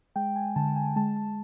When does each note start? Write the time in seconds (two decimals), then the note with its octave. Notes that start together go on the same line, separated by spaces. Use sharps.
0.16 G#3 G5
0.36 G#5
0.56 D3 A5
0.76 G#5
0.96 G#3 A5
1.16 A5